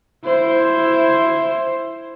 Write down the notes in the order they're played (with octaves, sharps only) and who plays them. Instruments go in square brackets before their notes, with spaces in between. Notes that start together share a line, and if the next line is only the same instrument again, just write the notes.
[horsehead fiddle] E4 C5